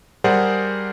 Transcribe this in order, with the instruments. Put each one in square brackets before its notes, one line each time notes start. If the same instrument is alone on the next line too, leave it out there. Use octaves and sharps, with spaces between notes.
[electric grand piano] G3 G#4 A#4 C5 D5 F#5